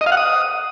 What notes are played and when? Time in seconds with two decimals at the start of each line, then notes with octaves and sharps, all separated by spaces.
0.01 D#5
0.06 F5
0.12 F#5
0.17 D#6